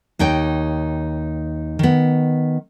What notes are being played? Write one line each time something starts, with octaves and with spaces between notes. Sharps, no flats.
D#2 D#4 C#5 G5
D#3 B3